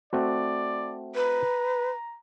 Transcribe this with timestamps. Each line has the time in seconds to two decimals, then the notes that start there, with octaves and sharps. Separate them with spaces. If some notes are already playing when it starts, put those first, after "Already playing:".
0.13 A3 C4 F#4 D5
1.15 B4 A#5